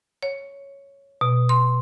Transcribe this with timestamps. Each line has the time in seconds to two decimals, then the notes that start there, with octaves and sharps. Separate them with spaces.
0.23 C#5
1.21 B2
1.49 C6